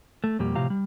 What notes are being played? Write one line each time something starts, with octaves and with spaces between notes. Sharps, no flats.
A3
F2 B2 G3 A#3 G4
A2 C3 F3 G4 F5 A#5
G3